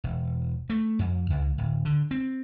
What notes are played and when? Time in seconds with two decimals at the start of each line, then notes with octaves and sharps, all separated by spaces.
0.04 E1
0.70 A3
0.99 F2
1.30 C#2
1.58 D1
1.85 D3
2.11 C4